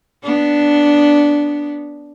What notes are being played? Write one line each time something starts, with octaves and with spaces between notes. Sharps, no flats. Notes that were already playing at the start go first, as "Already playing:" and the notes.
B3 D4